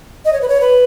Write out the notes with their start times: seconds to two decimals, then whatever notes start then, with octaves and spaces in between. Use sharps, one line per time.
0.25 D#5
0.33 C#5
0.41 B4
0.48 C#5
0.61 B4